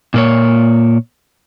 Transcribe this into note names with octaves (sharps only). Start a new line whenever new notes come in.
A#2 A#3 C#5